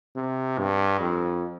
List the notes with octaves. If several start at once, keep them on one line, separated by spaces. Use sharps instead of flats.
C3
G2
F2